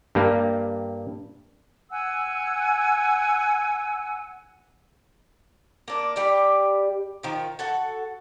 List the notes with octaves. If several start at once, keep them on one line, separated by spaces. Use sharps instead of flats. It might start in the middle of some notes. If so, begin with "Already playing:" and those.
G2 G3 A#3
F#5 G#5 E6
A#3 D4
G3 G4 D5
D#3 F3
F#4 A4 F#5